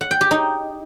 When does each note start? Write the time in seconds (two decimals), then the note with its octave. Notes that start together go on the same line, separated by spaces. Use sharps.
0.01 F#5
0.11 G5
0.21 G4
0.31 D#4